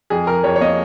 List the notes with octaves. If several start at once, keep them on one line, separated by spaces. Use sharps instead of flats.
F2 G#4
F2 A#4
F2 C#5
C#5
A#3 D#5